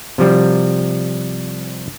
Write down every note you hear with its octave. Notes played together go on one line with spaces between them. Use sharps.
C3 F3 G3